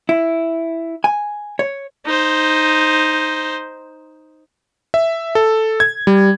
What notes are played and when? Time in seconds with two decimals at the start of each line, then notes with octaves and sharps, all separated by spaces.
0.09 E4
1.04 G#5
1.59 C#5
2.05 D#4 C5
4.94 E5
5.35 A4
5.80 G#6
6.07 G3